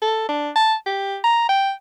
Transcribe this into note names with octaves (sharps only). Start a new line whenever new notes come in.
A4
D4
A5
G4
A#5
G5